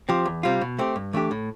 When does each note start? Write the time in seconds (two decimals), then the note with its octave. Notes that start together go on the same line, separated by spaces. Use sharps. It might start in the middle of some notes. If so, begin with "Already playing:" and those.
0.09 F3 C4 G4
0.26 E2
0.43 C3 G3 C4 F4
0.61 B2
0.79 A3 C4 G4
0.96 G2
1.13 E3 A3 D4 G4
1.31 A2